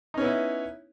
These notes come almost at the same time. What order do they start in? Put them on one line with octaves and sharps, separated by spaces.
D#4 C#4 B3 E4